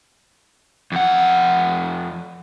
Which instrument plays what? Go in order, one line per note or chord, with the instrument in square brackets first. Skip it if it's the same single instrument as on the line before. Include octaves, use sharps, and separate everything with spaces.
[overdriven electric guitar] F2 F#5